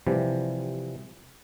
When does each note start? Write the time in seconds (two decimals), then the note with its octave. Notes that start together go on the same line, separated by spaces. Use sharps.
0.07 C3 E3 F3 G3